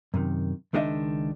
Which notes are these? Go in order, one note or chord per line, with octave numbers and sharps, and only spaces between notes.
F#2 C3 D#3
C#2 D#3 G#3 D4 D#5 E5